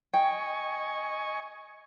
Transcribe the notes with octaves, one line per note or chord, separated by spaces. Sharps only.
D#5 G5 G#5 C#6